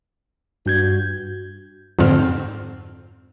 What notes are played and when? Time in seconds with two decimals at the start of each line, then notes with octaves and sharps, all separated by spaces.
0.66 G2 F#4 G6 G#6
1.99 F2 G#2 D3 C4 F6